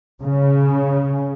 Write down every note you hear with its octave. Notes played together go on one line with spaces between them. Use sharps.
C#3